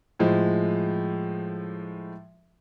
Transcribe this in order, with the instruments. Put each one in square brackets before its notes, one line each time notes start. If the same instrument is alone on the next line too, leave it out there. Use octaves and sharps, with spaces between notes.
[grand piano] A2 F3 G#3